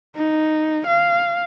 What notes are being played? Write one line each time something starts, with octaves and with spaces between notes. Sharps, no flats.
D#4
F5